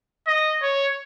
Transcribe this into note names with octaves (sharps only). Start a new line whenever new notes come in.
D#5
C#5